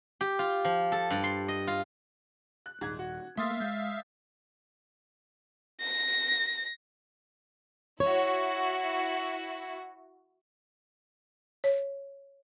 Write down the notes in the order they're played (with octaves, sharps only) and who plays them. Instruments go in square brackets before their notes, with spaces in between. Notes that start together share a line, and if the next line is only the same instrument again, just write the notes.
[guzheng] G4
F4
F3
A4
G2
C6
D#5
F4
[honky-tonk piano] F#6
[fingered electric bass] D#1 [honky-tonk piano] G#2 G#6
[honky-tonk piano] F#4
[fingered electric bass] A3 A#3 [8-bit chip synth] E5 F5 [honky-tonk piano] C6 D#6 A6
[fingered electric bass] G#3 [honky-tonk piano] G6
[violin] A#6
[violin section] E4 F#4 [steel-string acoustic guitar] C#5
[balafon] C#5